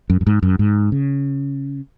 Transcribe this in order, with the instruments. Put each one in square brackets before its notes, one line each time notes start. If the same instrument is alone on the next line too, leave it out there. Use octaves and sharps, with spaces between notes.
[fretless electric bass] F#2
F#2
G#2
F#2
G#2
C#3